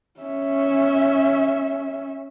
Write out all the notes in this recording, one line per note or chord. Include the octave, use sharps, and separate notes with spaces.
C#4 E5